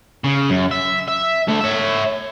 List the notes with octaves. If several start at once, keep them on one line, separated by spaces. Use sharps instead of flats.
C#3
F#2
E5
E5
D3 A3
C#5 E5